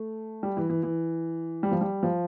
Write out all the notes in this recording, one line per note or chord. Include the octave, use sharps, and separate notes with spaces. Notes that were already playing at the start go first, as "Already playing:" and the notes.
Already playing: A3
G3
E3
E3
E3
G3
F3
G3
F3